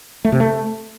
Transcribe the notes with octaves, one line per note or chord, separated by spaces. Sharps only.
A3
C3
A3